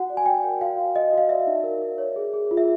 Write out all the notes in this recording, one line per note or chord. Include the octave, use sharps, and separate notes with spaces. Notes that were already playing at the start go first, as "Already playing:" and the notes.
Already playing: F#4 F#5
D5
G#5
D5 G5
A#4
F#4 F5
F#4
F#4 D#5
F#4 F5
D5 E5
D#4
A#4
A#4
C#5
G#4
G#4
F4
E5